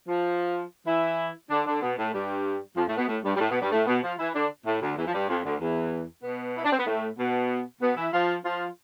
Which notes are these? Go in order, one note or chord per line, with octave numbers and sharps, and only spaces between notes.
F3 F4
E3 E4
D3 D4
D3 D4
B2 B3
A2 A3
G2 G3
F2 F3
A2 A3
B2 B3
A2 A3
G2 G3
G3
A2 A3
B2 B3
G2 G3
A2 A3
B2 B3
F3 F4
E3 E4
D3 D4
A2 A3
D2 D3
E2 E3
F3
G2 G3
F2 F3
D2 D3
E2 E3
B2 B3
E4
D4
C4
B3
A2 A3
B2 B3
B2 B3
E3 E4
F3 F4
F3 F4